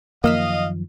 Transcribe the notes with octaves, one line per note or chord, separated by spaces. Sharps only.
F#2 D#3 F3 A#3 D#5 F5 E6 B6